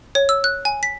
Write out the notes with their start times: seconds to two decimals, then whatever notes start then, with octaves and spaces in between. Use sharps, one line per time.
0.15 C#5
0.29 E6
0.44 F#6
0.65 G#5
0.83 B6